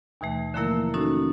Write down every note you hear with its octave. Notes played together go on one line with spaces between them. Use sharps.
D#2 B2 E3 A3
D3 F3 A3 A#3 E4 A#4
C#4 D#4 F#4 A4